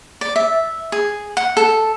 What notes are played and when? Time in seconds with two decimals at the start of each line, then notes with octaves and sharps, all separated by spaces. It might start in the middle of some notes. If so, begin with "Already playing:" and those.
0.21 D5
0.36 E5
0.92 G#4
1.37 F#5
1.57 A4